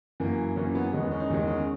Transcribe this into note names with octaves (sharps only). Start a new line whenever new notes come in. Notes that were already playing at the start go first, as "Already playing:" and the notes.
F#2 E3 A#3
F#2 E3 A#3 C#4
B3
E2 D#3 G#3 C#4
B3
C#4
D#4
E2 D#3 G#3 C#4
C#4